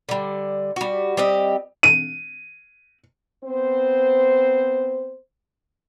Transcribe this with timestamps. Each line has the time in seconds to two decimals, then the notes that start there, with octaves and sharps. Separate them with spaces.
0.09 D3 G3
0.76 G3 F#4
1.17 G3 C4 G4 D#5
1.83 D#7
3.44 B3 C4 C5